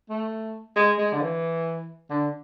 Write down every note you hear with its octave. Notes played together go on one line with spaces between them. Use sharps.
A3
G#3
G#3
D3
E3
D3